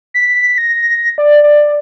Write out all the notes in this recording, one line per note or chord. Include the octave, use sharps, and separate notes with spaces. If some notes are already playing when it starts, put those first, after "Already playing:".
B6
A#6
D5
D5